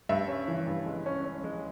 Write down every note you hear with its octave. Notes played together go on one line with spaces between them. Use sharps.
G2 E5
C#4
E3
G2
G#3
C#4
C#4
G#3